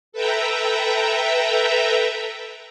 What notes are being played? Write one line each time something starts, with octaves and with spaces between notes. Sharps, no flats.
A4 B4 E5 G5 A#5